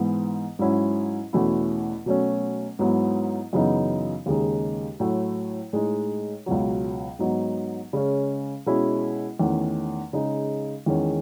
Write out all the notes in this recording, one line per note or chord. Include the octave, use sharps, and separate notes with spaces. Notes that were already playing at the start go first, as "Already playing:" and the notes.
Already playing: G#2 E3 B3
G#2 F#3 C#4 E4
E2 B2 A3 C#4 E4
B2 F#3 A3 C#4
G#2 F#3 B3 E4
F#2 C#3 E3 B3 D#4
D#2 C#3 G#3 D#4
A2 F#3 A3 E4
A2 G#3 D#4
C#2 B2 F#3
G#2 F#3 B3 D#4
C#3 G#3 C#4
B2 G#3 C#4 E4
E2 D#3 A3 C#4
C#3 G#3 D#4
E2 D#3 G#3 C#4